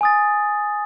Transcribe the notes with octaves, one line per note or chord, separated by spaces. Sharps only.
G#5 D#6 A6